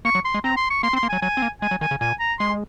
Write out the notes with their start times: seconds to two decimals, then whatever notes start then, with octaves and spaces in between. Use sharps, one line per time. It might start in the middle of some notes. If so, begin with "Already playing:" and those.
0.05 A#3 C#6
0.15 F#3
0.25 C6
0.34 G#3
0.44 C4 A#5
0.57 C6
0.71 C#6
0.83 A#3 C6
0.93 C4
0.96 C6
1.03 A#3
1.09 F#3 G#5
1.22 F#3 G#5
1.37 C4
1.42 A#3
1.62 G#3 G#5
1.71 F#3
1.81 D#3 G#5
1.91 C#3
2.01 A#2 G#5
2.20 A#5
2.39 G#3 C6